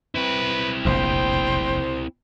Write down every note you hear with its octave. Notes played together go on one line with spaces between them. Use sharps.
C4 E4 B4
F1 A#1 E2 C5 G5